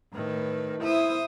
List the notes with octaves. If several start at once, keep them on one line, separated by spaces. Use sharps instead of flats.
A2 D#3 B4
E4 C5 E5 D#6